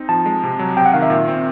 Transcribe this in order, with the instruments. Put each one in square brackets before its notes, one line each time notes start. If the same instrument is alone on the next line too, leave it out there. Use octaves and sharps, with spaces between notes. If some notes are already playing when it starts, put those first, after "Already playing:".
Already playing: [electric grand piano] C4 D#4
[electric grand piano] F3 [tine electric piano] A5
[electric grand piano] G#3
C3
F#3
[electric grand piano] C3 [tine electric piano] G5
[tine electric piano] F#5
[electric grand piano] D#3 [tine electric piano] F5
[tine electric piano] E5
[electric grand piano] A#2
C4